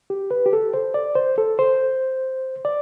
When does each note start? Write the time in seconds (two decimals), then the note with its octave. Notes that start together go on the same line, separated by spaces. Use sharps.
0.10 G4
0.31 B4
0.46 G4
0.53 A4
0.74 C5
0.94 D5
1.15 C5
1.38 A4
1.59 C5
2.65 D5